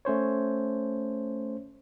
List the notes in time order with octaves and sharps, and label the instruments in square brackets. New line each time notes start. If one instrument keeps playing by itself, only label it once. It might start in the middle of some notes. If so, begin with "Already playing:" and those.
[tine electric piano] A3 C#4 C5 C#5